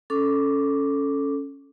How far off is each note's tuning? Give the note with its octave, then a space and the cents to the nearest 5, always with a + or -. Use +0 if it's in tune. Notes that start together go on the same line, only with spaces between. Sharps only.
C#4 +0 A4 +0 D6 +0